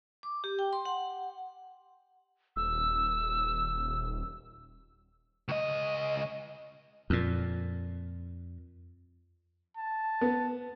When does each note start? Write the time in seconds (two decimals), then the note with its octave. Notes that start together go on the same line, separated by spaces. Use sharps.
0.23 D6
0.44 G4
0.59 G5
0.73 C6
0.85 F#5
2.56 D#1 E6
5.48 C#2 D#5
7.10 F2 A#2
9.77 A5
10.21 B3